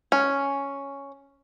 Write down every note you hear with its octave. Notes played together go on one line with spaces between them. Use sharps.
C#4